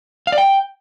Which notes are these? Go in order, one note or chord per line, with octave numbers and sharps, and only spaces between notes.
F5
D5
G5